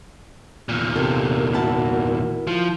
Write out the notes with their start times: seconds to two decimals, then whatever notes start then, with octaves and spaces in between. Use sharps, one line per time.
0.69 E2 A#2
0.96 C3 A4 A#4
1.54 E4 F#4 A5
2.47 F3